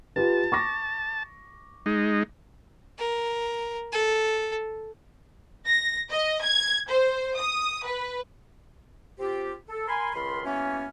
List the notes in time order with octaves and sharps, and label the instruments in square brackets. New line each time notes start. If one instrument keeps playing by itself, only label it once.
[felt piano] F4 G4 B4 [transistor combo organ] A5
[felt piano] C#6 D6 A#6
[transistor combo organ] G#3 D#4
[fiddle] A#4
A4
[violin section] A#6
D#5
G#6
C5
D#6
B4
[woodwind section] C4 F4 G4
A4
A#4 G#5 B5 C6
C#2 D#3 B5 C6
E3 F#3 A#3 B3 C#4